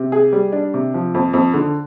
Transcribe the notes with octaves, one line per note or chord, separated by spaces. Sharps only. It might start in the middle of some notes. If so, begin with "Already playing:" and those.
Already playing: C3
G#4
G3
D4
C3
F3
F2
F2
D3